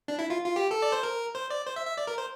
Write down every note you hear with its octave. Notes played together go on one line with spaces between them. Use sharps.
D4
E4
F4
F4
G4
A4
D5
C5
A#4
C5
D5
C5
E5
E5
D5
A#4
C5